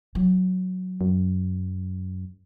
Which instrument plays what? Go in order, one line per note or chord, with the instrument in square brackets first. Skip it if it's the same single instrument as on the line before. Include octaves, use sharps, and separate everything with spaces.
[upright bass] F#3
[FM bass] F#2